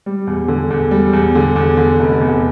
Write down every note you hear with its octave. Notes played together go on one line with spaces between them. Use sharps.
G3
E2
D3
E2
G3
E2
D3
E2
D3
F1
E2